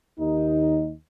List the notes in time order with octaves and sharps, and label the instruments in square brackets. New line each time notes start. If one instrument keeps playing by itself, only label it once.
[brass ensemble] D#2 D#4